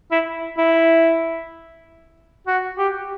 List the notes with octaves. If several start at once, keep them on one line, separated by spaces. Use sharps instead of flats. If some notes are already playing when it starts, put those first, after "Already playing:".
E4
E4
F#4
G4